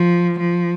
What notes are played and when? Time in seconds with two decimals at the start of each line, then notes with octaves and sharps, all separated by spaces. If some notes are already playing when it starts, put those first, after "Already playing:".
Already playing: F3
0.39 F3